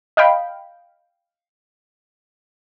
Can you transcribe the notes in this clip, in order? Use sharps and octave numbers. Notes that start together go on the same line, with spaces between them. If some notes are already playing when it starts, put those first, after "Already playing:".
D#5 F5 G5 B5